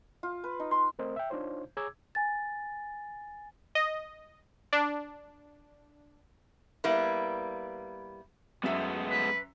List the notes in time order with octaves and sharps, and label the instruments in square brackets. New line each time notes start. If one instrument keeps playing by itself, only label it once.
[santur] F4
B4
D#4
C6
[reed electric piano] A3 C4 A#4 C5 D#5
E5 G5
D4 D#4 F4 C5 C#5
G#4 C#5 A#5 D6 E6 G#6
[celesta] G#5 A6
[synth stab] D#5
D4
[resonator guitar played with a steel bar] G3 A#3 B3 E4
[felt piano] F#2 E5 [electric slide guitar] G#3 A3 B3
[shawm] B4